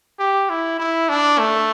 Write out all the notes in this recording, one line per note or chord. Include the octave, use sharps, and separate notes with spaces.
G4
E4
E4
D4
A3